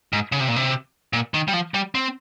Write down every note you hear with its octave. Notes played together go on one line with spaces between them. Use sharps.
G#2
C#3
C3
A#2
C3
A#2
D#3
G3
F3
G3
C4